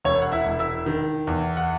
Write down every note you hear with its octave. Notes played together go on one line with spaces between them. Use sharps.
E1 C#5
F#5
E4 E5
E1
E4 E5
D#3
E2
F#5